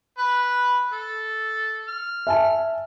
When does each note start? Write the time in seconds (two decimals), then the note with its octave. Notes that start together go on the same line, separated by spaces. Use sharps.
0.18 B4
0.92 A4
1.88 F6
2.27 E5 G#5 A5